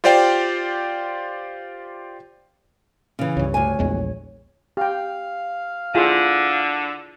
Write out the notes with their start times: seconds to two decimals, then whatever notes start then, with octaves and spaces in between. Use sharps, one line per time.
0.04 F4 G4 C5 D5 F5 G5
3.19 C#3 E3
3.37 C#2 G2 C#5
3.54 D2 G#5
3.79 A#1 E2 G#3
4.77 G4 F5 G5
5.95 D3 E4 F4 G#4